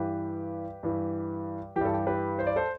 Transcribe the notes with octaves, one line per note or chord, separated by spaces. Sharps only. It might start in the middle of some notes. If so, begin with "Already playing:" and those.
Already playing: G2 E3 G4 B4
G2 E3
E3 G4
G2 A4
G4
G4 B4
C5
D5
A4 C5